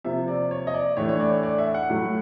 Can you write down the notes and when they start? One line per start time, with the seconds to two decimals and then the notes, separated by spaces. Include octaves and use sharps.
0.04 C3 F3 A#3 E5
0.28 D5
0.51 C#5
0.67 D#5
0.74 D5
0.97 A2 E3 A3 D4 C#5
1.09 C#5
1.20 D5
1.32 C#5
1.43 D5
1.58 E5
1.74 F#5
1.90 A2 F#3 A3